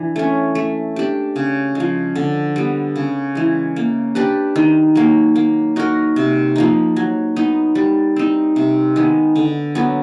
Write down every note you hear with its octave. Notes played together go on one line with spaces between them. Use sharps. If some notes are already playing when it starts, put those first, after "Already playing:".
Already playing: E3 D4
A3 C#4
A3
D4 G4
C#3
F3 G#3
D3
G3 B3
C#3
E3 G#3
A#3
D4 G4 B4
D#3
F#3 A#3
A#3
D#4 F#4 A#4
C3
F3 A#3 D#4
F#3
B3 D#4
G3
C4 D#4
C3
D#3 G#3 B3
D3
F#3 B3